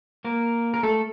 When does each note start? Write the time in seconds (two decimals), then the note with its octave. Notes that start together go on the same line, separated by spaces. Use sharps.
0.25 A#3 A#4
0.74 A#4
0.83 A3 A4